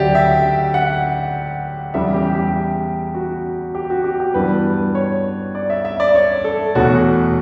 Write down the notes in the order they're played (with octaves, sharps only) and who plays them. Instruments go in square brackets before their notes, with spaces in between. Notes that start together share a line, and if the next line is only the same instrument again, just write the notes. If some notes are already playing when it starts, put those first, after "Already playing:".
Already playing: [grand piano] D2 C#3 F#3 G4 D5 E5
E5
F#5
E2 C#3 G3 E5
G4
G4
F#4
G4
F#4
G4
G4
G2 E3 B3 B4
C#5
D5
E5
E5
D5
C#5
A4
E2 B2 A3 C#4 F#4